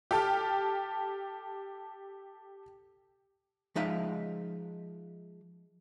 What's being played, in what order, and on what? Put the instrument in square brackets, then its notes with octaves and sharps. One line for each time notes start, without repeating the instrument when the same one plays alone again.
[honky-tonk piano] G4 A4 A5 F6
[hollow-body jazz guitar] F3 G#3 D#4 E5 F5